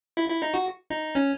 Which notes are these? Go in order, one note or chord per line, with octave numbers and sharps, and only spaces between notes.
E4
E4
D#4
F#4
D#4
C#4